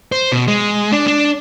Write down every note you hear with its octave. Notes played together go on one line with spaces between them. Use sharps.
C5
B2
G#3
D4
D4